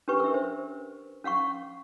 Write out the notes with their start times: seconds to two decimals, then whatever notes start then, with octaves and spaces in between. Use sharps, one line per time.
0.08 C#4 D4 G4 B4 C#6
0.20 A#4 E5
0.34 C5
1.24 C#4 F5 F#5 C#6